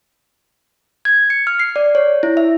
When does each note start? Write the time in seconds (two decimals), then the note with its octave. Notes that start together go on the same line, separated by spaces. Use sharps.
1.05 G#6
1.30 C#7
1.47 F6
1.59 C7
1.76 D5
1.95 C#5
2.23 E4
2.37 E5